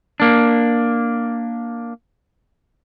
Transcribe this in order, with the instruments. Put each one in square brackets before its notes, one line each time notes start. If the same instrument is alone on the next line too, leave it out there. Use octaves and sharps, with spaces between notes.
[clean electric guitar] A#3 D4